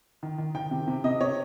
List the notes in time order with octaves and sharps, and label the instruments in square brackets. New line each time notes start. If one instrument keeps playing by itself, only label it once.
[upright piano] D#3
D#3
D#3 G5
C3
C3
C3 D#5
C3 C#5